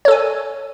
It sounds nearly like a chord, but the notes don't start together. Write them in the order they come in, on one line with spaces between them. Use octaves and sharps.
C#5 A4 G#5